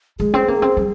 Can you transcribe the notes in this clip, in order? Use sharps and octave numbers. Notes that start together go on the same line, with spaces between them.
G#3 G#4
C4
A#3
C4
G3